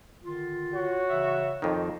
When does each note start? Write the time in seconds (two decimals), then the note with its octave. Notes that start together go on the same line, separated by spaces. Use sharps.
0.24 D3 D#3 F4
0.74 F#4 C#5
1.10 C#3 E3 E5
1.62 F2 D#3 D#4